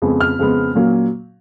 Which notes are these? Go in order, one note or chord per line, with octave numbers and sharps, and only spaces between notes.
F2 C#3 G#3 B3
F6
F2 C#3 G#3 B3
A#2 F#3 A#3 C#4